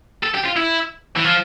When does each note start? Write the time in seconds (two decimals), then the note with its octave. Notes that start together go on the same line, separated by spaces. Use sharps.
0.23 A4
0.35 G4
0.46 F4
0.57 E4
1.16 E3
1.24 F3